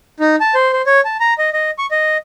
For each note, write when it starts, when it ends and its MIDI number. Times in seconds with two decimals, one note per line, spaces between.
0.20 0.36 63
0.40 0.55 81
0.55 0.72 72
0.73 0.82 72
0.86 1.01 73
1.05 1.17 81
1.20 1.34 82
1.38 1.50 75
1.53 1.71 75
1.78 1.86 85
1.91 2.17 75